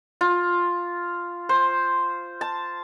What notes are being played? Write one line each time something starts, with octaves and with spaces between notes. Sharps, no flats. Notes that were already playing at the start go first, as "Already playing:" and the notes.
F4
C5
A5